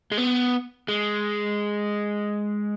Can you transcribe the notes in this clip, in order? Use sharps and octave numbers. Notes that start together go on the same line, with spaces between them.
G#3
B3
G#3